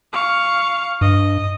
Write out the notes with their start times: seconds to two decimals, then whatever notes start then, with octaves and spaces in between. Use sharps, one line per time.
0.13 F5 C#6
1.01 G2 D#5